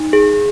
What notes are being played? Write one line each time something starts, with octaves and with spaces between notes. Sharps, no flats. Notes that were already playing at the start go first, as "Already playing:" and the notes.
Already playing: D#4
G#4